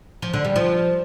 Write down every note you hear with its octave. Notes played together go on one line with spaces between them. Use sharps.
F3
D3
G3
F3